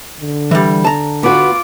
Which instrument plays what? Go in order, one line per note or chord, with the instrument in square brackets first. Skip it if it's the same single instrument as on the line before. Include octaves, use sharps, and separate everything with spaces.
[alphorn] D3
[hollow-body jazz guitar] E3 G3
A5 A#5
[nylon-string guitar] B3 F#4 [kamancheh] F4 D6